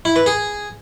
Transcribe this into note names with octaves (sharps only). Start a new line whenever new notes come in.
E4
B4
G#4